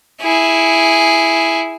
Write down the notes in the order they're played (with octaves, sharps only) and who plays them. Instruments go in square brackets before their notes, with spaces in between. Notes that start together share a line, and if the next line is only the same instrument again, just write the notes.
[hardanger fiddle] E4 G#4